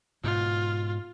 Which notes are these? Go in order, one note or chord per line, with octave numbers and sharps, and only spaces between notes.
G#2 B2 F4